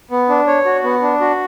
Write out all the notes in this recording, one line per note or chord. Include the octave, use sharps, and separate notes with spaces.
B3
D4
C#5
F#4
B3
D4
F#4